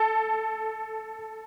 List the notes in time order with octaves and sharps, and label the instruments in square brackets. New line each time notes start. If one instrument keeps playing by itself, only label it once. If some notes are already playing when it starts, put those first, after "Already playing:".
Already playing: [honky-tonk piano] A4